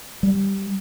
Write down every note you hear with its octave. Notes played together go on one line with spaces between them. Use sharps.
G3